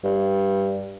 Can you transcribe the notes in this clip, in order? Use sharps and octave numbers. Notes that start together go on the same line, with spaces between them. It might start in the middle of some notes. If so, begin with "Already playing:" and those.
G2